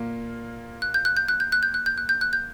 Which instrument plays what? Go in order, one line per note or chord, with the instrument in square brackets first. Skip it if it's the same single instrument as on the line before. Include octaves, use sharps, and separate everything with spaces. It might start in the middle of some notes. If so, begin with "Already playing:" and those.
Already playing: [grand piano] A#2 A#3 F4
[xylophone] F#6
G6
F#6
G6
F#6
G6
F#6
G6
F#6
G6
F#6
G6
F#6
G6